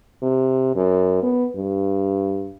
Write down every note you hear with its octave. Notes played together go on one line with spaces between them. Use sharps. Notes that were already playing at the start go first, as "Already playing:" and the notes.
C3
F#2
B3
G2